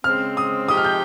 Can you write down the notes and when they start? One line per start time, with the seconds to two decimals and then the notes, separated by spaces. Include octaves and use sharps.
0.04 C#3 G#3 C4 F6
0.37 D#6
0.68 C3 F3 G#3 D#4 G4 D#6
0.77 F6
0.84 G6